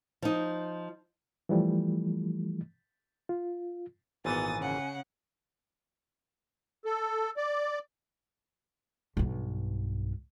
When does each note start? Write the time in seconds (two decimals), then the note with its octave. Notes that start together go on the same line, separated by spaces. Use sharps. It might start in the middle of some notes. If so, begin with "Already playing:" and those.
0.22 F3 D#4
1.49 E3 F3 G3 A3
3.29 F4
4.25 G#1 A#2 E3 B3 G#5 D#6 A6
4.59 C#3 F#5
6.85 A4
7.37 D5
9.17 B1 G2